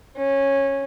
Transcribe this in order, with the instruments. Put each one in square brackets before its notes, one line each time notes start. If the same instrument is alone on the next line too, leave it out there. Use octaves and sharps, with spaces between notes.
[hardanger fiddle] C#4